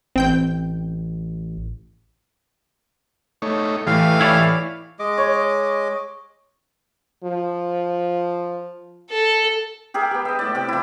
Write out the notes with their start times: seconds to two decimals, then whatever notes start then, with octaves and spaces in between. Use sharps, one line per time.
0.16 A1 C4 G5 G6
3.42 A3 D#4 C#5
3.87 A2 E3 A3 G4 F5
4.21 E4 C#5 D5
4.99 G#3 D#5 D6
5.18 C#5
7.24 F3
9.10 A4
9.94 G4 G#4 A#4 E5
10.11 B3 G4
10.25 D#5 E5
10.39 A2 D5
10.55 C3 G5
10.69 F3 E4